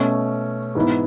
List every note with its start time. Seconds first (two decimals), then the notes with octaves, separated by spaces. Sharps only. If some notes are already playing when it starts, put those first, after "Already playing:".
Already playing: B2 A3 C#4
0.75 G#2 E3 B3 E4